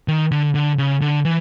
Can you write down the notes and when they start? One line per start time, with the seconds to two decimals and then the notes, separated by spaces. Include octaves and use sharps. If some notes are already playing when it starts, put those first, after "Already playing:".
0.08 D#3
0.32 D3
0.55 D3
0.78 C#3
1.01 D3
1.25 E3